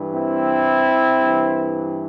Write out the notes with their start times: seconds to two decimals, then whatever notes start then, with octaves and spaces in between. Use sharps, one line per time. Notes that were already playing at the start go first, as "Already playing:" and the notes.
Already playing: G2 E3
0.15 C4 E4
1.20 G2 E3